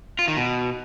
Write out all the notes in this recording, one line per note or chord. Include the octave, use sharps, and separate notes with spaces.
F4
D#3
B2